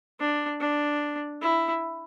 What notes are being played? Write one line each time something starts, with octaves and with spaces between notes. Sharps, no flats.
D4
D4
E4